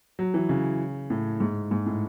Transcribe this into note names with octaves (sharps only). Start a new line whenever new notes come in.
F#3
E3
C#3
A2
G#2
G#2
A2